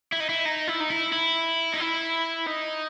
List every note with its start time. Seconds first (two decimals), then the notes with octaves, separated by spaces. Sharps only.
0.12 E4
0.20 D#4
0.29 E4
0.46 D#4
0.68 E4
0.81 D#4
0.90 E4
1.12 E4
1.74 D#4
1.80 E4
2.47 D#4